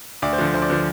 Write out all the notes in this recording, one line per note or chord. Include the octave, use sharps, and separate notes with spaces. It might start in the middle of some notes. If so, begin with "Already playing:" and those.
D2 D5
C5
D3 F3
D2 C5
D5
D3 F3 C5